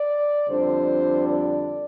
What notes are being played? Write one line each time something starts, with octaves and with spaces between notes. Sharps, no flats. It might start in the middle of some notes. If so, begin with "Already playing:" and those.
Already playing: D5
F2 D3 G3 D4 C5
D5